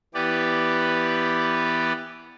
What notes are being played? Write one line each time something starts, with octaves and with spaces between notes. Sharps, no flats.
E3 B3 G4 B4 D5